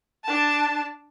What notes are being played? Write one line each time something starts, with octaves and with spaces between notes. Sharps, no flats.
D4 A5